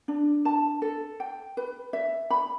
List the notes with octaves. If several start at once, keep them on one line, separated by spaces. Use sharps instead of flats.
D4
A5
A4
G5
B4
E5
B5